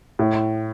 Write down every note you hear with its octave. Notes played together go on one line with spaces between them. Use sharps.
A2